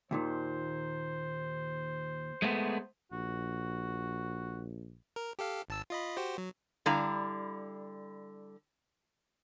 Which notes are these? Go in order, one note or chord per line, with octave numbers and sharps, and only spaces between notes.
D#2 A#2 D#3 C5
G#3 A3 B3
A#1 F#4
A#4
G4 A4 F5
G#1 A5 E6
F4 D#5 B5
F#4 G4 C5
F#3
D3 G3 E4 F5 A#5